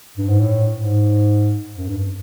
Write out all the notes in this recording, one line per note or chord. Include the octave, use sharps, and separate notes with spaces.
G2
G#2
A2
G#2
F#2
G2